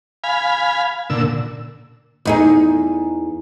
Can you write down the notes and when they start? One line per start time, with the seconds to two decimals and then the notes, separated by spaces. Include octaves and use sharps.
0.24 F5 G#5 B5
1.10 A#2 D3 E6
2.25 E2 D#4 G#4